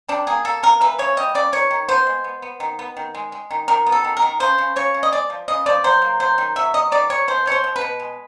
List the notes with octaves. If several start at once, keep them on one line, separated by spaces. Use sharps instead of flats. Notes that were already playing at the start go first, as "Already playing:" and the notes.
G3 D4
A#3 G#4
A#3 A4
A#3 A#4
E3 B4
C#3 C#5
G3 D#5
C#3 D5
D#3 C#5
D#3
B3 C5
G#3
B3
B3
D#3
B3
D#3
G#3
G#3
D#3
D#3 A#4
B3
A4
D#3
A#4
D#3
C#3 C5
C#3
C#3 C#5
C#3
D#5
G#3 D5
F3
C#3 D#5
F3 D5
F#3 C5
A#3
F#3 C5
D#3
F#3 E5
F#3 D#5
D#3 D5
D#3 C#5
B2 C5
B2 C#5
C5
B2
B4
B2
G#3